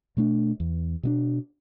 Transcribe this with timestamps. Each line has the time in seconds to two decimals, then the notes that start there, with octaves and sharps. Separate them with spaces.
0.17 B2 A3 D4
0.60 E2
1.03 B2 A3 D4